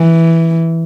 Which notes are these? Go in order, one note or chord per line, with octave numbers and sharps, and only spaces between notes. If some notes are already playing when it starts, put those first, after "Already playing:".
Already playing: E3